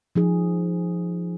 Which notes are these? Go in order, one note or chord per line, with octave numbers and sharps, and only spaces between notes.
F3 D#4 G#4